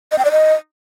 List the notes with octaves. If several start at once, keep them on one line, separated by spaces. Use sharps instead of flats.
D#5
G5
D5
D#5